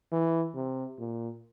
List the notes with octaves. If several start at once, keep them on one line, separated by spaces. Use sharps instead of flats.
E3
C3
A#2